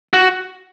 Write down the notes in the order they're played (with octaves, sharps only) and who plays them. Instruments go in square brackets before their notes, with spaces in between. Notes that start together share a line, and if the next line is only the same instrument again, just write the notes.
[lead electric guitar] F#4